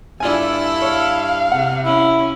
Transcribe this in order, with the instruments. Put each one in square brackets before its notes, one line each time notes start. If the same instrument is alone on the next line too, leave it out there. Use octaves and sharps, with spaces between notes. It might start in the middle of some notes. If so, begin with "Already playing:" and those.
[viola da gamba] G2 E4 A4 [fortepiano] D4 F4 G#5
[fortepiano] C#5 [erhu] F5
[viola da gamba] C3 [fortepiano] F#5
[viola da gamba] C#4 [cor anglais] E4